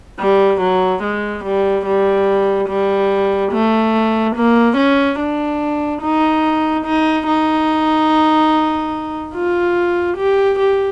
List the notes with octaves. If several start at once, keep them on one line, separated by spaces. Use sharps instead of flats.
G3
F#3
G#3
G3
G3
G3
A3
A#3
C#4
D4
D#4
D#4
D#4
F4
G4
G4